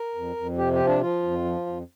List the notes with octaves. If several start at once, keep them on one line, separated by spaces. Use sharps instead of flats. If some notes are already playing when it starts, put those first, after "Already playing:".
Already playing: A#4
F2
F2
C3 G4
G4
F3
D4
F3 F4
F2
F3
F2